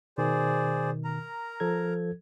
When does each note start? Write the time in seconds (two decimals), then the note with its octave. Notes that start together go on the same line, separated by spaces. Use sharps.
0.18 B2 D#3 G#4 C5 D5
1.04 A#4 A#5
1.60 F3 A4 G#6